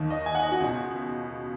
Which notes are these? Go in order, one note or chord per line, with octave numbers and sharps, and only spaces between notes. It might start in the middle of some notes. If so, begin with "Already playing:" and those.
Already playing: D#2 D#3
D#5
G#5
F#5
D#5
F#4
C#2 B2